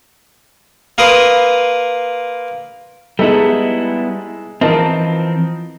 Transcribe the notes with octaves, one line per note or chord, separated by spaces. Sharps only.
A#3 A#4 B4 C6 D#6
G3 G#3 B3 D#4 E4 A4
E3 F3 C4 D#4 A#4 A5